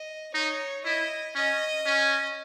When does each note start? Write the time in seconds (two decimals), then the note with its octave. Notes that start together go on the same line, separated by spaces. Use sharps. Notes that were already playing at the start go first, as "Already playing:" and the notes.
Already playing: D#5
0.34 D#4 C#5
0.85 E4 D#5
1.35 C#4 D#5
1.86 C#4